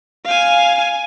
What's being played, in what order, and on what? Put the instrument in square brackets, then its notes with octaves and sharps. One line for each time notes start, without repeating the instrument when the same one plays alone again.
[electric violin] F5 G#5